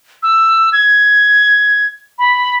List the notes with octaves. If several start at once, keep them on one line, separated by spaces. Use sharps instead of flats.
E6
G#6
B5